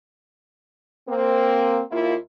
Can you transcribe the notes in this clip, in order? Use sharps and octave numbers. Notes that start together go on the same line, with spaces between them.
A#3 C4
D#2 A#3 E4 F4